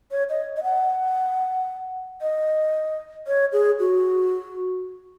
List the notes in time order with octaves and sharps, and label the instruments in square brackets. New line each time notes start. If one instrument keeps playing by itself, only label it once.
[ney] C#5
D#5
D#5
F#5
D#5
C#5
G#4
F#4